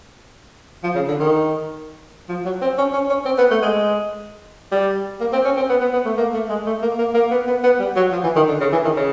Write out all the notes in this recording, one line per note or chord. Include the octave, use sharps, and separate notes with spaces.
F3
C#3
D3
D#3
F3
F#3
C4
C#4
C#4
C#4
C4
B3
A3
G#3
G3
A#3
C4
C#4
C4
B3
B3
B3
A3
A#3
A3
G#3
A3
A#3
A#3
A#3
B3
B3
B3
G3
F#3
F3
E3
D#3
D3
C#3
E3
D#3
C#3